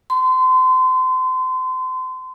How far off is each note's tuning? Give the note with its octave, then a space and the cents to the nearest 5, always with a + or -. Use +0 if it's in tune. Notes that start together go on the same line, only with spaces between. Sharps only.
C6 -30